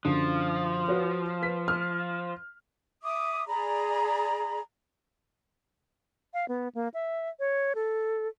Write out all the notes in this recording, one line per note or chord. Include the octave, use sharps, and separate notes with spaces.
F#2 D3 F3
F#4 B4 C#5
B4 B6
F6
E5 D6 D#6
G#4 D5 A#5 B5
F5
B3
A#3
E5
C#5
A4